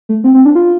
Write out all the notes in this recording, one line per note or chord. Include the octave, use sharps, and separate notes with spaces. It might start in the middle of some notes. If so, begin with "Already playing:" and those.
A3
C4
C4
D4
F4